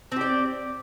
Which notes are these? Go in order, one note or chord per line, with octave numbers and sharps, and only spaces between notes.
C4 G4 D5